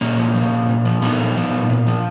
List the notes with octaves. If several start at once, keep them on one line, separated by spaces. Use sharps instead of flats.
A#2 A#3 C#4
F3
F3
A#2
A#2
F3
A#2 B3 D#4
F3
F3
A#2
A#2
F3